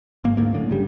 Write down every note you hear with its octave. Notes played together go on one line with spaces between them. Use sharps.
G1 G#2 A#3
D2 G#2 A#3
F#2 A2 D3
G1 C#3 G3